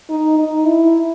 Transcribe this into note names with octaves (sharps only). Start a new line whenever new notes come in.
D#4
D#4
E4